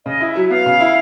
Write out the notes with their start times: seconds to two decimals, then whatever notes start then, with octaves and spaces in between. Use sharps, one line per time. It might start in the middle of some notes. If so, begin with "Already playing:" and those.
0.06 C#3 D#5
0.21 E4
0.28 E5
0.36 F#3
0.50 B3 F5
0.66 C#3
0.81 E4